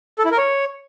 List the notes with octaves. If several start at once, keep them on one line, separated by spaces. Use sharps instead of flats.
A4
E4
A#4
C#5